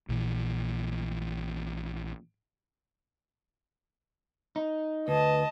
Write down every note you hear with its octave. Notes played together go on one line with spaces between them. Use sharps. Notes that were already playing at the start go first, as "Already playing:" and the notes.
A#1 A#2 E3
D#4
D2 B4 D#5 A5